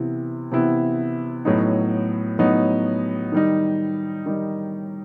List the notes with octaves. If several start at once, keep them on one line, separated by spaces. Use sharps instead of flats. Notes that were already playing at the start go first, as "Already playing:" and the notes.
Already playing: C3 E3 B3 E4
C3 E3 B3 E4
A2 F#3 B3 D#4
A2 F#3 B3 D#4
D#3 G3 D#4
D#3 G3 D#4